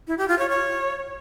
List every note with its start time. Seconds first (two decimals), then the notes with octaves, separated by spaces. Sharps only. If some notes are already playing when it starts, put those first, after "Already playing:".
0.07 E4
0.18 G4
0.28 F4
0.39 C#5
0.49 C#5